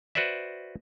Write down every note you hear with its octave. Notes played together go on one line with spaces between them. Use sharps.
F#4 B4 C5 D5 E5